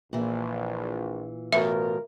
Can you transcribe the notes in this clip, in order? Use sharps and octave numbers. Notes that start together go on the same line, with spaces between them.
A#1 A#2 E3
A1 B2 F4 A#4 E5